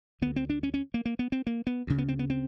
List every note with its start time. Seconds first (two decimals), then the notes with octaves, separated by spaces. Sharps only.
0.22 D2 D3 B3
0.36 C4
0.50 D4
0.63 C#4
0.74 C#4
0.94 A#3
1.05 A#3
1.19 B3
1.32 C4
1.47 A#3
1.67 B3
1.87 D2 C#3
1.98 B3
2.08 C4
2.19 B3
2.30 C4